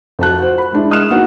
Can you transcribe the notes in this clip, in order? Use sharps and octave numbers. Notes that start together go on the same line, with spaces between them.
F2 F#4 A5 F#6
F#4 C5
B5
G#3 D4 E4
G#3 D#5 D#6 F6 F#6 E7
A#3 B3 D#4 F#4 A#4